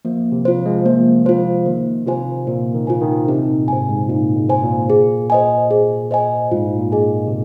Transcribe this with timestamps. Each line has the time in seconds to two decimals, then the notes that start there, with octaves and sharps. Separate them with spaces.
0.05 F3 A#3
0.32 C3
0.45 F4 C5
0.59 F3
0.66 G#3
0.73 F3
0.86 F3 A#3
1.25 F3 F4 C5
1.66 D#3 A#3
2.06 C3 F4 C5 G#5
2.47 A#2 A#3
2.74 D#3
2.87 F4 C5 G#5
3.01 D#3
3.28 C3 D#4
3.49 A#2
3.68 G#2 C5 G#5
3.89 G#2
4.09 A#2 D#4
4.36 G#2
4.49 C5 G#5
4.64 A#2
4.90 G#4
5.30 C5 D#5 G#5
5.71 G#4
6.11 C5 D#5 G#5
6.51 G#2 F4
6.79 A#2
6.92 G#4 D#5 G#5
7.27 C3